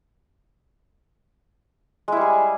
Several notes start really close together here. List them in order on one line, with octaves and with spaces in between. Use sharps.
G#3 E4 G3 G#4